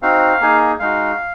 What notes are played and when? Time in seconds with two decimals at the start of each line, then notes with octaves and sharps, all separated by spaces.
0.02 C4 D#4 F#4 F5
0.40 A#3 D#4 G#4
0.79 G#3 D#4 F#4 F5